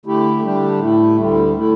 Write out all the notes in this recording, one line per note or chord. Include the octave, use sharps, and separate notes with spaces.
D3 A3 E4 G4
D3 G3 D4 G4
A2 A3 E4
D2 D3 G3
D3 A3 E4